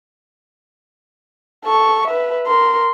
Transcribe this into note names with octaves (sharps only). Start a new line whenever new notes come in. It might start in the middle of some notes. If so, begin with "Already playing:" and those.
A4 C#6
B4 E5
A#4 C6